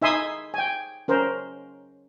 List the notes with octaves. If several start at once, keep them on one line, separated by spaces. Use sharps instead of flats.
D#4 E5 G#5 C6 D#6
G5 G#5
C#4 A#4 C5